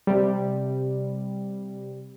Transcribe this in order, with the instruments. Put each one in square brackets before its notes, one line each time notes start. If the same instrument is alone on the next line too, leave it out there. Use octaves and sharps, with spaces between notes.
[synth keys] C3 G3